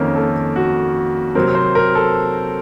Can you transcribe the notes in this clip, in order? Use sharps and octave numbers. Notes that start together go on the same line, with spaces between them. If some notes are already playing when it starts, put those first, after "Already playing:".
Already playing: F2 D#3 A#3 C#4 A#4
A4
F#4
C3 F#3 C4 A#4
C5
A#4
A4